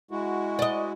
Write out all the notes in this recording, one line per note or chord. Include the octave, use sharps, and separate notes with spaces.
G#3 E4 F#4
D5 D#5